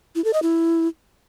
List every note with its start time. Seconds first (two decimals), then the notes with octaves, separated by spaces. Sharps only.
0.15 E4
0.24 A4
0.33 D#5
0.43 E4